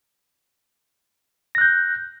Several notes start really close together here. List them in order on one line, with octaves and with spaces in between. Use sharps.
A#6 F#6 G6